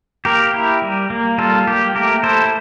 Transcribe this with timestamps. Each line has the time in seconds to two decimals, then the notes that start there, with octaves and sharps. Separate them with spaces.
0.25 A#3 G4 A#4
0.54 E4
0.82 G3
1.10 A#3
1.38 G3 F4 A4
1.67 A#3 G4
1.95 A3 G4 A#4
2.23 E4 A4 C5